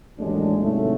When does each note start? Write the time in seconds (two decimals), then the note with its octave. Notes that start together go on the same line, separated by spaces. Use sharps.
0.18 A1 D#2 A2 F#3 G#3 D4
0.62 G#2 C3 F#3 A3